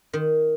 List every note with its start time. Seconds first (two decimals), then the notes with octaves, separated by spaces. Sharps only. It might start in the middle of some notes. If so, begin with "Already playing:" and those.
0.13 D#3